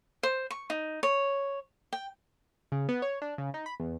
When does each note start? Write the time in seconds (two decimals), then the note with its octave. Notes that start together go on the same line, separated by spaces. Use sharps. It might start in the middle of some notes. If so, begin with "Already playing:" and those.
0.23 C5
0.50 C#6
0.70 D#4
1.03 C#5
1.93 G5
2.72 C#3
2.89 B3
3.02 C#5
3.22 D4
3.38 C#3
3.54 D#4
3.66 B5
3.80 E2